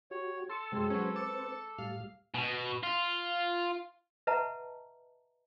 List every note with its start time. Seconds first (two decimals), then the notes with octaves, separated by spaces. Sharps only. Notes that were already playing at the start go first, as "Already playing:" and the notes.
0.11 F#4 G4 C#5
0.49 A4 C6 E6 A6 C#7
0.72 F#2 C3 G#3 G#4 C6
0.90 F#3 C4 C#4 B4 C5
1.16 D6 E6 A6 C#7 E7
1.78 A2 G3 F5
2.34 B2
2.83 F4
4.27 B4 D#5 E5 F#5 A5 A#5